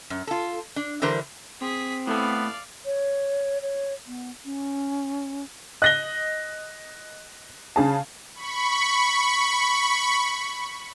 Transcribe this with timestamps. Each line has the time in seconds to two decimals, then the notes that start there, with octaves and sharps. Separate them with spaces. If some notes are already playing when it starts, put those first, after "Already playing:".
0.10 F#2
0.27 F4 A4
0.76 D4
1.02 D3 E3 G3 A#4 C5
1.62 C4 G#4 B6
2.07 A2 A3 B3 A4 D5 F5
2.85 C#5
3.62 C#5
4.07 B3
4.45 C#4
5.82 D#5 F#6 A#6 G7
7.76 C#3 G#4 A5
8.34 B5 C#6